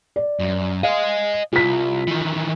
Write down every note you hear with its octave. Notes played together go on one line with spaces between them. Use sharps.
D5
F#2
D#5 F5 G#5
C2 F4 B6
D#3 E3